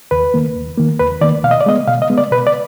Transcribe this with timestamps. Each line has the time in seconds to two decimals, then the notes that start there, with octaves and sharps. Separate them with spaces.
0.11 D#2 B4
0.34 D#3 A#3
0.56 D#2
0.78 D#3 A#3
0.99 D#2 B4
1.21 D#3 A#3 D5
1.44 B2 F5
1.51 D#5
1.61 D5
1.66 G#3 B3 D#5
1.87 B2 F5
2.02 D#5
2.10 G#3 B3
2.18 D5
2.31 B2 B4
2.47 D5